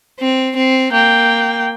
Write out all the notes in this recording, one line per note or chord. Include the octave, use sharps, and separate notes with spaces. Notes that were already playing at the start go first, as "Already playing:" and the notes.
C4
C4
A#3 G5